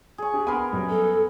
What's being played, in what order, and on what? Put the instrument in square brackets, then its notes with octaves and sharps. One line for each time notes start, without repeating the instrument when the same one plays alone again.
[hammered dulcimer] G#4 C#6
[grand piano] D4 G4
[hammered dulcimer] B3 A#4 [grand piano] G#5 B5 C6
[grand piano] F#2 G3
[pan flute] A4